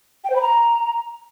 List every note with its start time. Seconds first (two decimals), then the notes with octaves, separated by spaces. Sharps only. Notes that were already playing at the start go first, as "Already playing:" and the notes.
0.24 G5
0.30 C5
0.36 B5
0.42 A#5